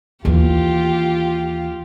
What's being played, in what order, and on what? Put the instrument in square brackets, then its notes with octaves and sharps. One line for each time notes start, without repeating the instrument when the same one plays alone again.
[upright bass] D#2 E3 [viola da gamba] F4 G4